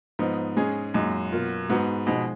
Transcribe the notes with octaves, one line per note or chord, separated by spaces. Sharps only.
G#2 F3 B3 D#4
G#3 C#4 G#4
F#2 A#2 G#3 D#4
B2 A#3 F4
G#2 G#3 B3 F#4 B4
B2 F3 G#3 D#4